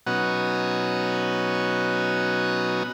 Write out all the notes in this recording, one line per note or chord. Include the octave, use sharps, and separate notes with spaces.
B2 F#3 B3 C#4 D#4 F#4